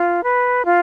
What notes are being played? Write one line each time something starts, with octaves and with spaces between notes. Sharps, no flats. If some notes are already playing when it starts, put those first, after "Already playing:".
Already playing: F4
B4
F4